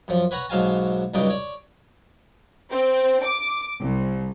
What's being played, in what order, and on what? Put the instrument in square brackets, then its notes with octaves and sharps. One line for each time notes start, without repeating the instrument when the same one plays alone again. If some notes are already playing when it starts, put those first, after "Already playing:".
[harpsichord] F#2 F3
B4 C#5 F#5 A#5 B5
B1 G#2 F#3 F5 G#5 A5
C#2 G2 F#3 D#4 D6
C#5 D5
[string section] C4
D6
C2